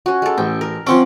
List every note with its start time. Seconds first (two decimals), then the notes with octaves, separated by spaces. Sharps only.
0.06 C#4 F#4
0.22 G#3 A4
0.38 A1 G5
0.61 A#4
0.87 F3 C4 C#4 F#5 D6